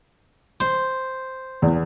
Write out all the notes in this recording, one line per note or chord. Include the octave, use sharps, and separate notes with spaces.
C5
E2